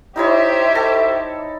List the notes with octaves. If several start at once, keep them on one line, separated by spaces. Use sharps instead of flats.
D#4 E4 G4 C5 C#5 E5
A4